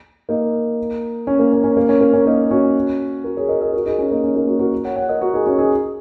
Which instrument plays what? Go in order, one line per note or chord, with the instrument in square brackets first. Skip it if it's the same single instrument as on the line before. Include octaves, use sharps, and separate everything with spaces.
[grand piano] A#3 D#4
C#4
A#3
C#4
C#4
A#3
C#4
A#3
C#4
A#3 D#4
C#4 F#4
F#4 A#4
G#4 C#5
A#4 D#5
A#4 D#5
F#4 A#4
D#4 G#4
C#4 F#4
A#3 D#4
C#4
A#3 D#4
C#4 F#4
F#4 A#4
C#5 F#5
C#5 F#5
A#4 D#5
F#4 A#4
D#4 G#4
C#4 F#4
D#4 G#4